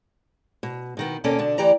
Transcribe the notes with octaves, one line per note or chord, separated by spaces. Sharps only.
B2
B2 D#3 B3
D#2 B2 A#3 C#4 A4 D5
B2 D3 D4
D2 E3 G4 D5 A#5